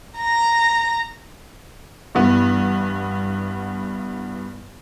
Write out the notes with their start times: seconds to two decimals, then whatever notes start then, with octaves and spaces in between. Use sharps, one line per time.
0.18 A#5 A#6
2.15 G2 E3 B3